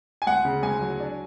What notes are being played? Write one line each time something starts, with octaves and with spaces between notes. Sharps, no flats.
G#5
D2 F#5
C#3
D2 G#5
F#3
D4